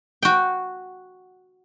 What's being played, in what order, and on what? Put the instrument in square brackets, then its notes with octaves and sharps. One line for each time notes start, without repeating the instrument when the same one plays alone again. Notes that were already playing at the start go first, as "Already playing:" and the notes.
[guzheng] F#4 G5